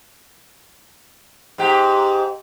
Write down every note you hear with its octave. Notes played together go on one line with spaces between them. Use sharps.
G#2 G4